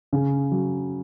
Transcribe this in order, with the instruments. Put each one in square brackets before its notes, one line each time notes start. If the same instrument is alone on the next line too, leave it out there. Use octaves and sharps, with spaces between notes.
[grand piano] C#3
F#3